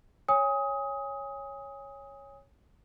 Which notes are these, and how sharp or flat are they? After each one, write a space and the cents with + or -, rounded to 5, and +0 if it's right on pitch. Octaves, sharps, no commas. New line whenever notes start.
C#5 +0 G#5 -25 D#6 +25